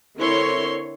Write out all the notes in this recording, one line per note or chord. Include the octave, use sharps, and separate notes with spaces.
D3 C4 E4 A#4 C#5 C6